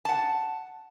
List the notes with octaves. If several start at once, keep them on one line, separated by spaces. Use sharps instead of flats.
F#5 A5